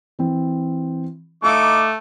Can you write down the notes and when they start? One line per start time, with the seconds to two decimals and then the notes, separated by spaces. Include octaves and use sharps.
0.19 E3 C4
1.44 A3 D#4 F5 D6 E6